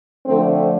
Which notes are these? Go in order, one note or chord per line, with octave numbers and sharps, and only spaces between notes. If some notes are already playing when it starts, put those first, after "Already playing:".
D3 F3 A3 C4